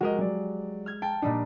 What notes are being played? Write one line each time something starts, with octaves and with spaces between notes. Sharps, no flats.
G#3 F#4 G4 A#4 D#5
F#3 D5
F6 G#6
G5 A5
A#2 G3 D4 D#4